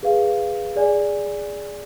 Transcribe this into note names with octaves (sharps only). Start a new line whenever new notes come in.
G#4 B4 F5
G#4 D5 G#5